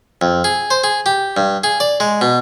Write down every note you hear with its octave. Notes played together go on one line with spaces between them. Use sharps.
F2
G#4
C5
G#4
G4
G2
G#4
D5
G#3
B2